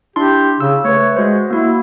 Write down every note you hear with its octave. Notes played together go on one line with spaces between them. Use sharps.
D4 E4 G4 C6
C#3 E6
A3 B4 C#5
G#3 F#4 C5
A#3 E4 F#4